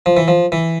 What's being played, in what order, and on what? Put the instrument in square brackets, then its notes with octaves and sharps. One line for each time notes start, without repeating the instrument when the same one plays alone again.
[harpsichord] F3
E3
F3
E3